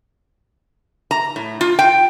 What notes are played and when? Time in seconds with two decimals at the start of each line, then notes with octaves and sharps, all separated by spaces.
1.11 A#5
1.36 A2
1.61 F4
1.79 G5